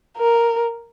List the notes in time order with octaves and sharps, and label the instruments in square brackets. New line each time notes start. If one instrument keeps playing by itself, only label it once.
[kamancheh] A#4